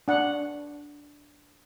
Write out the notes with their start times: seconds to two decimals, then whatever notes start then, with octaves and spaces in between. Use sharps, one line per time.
0.08 D4 F#5